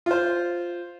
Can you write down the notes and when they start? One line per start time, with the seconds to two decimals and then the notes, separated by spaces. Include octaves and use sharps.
0.06 F4 C5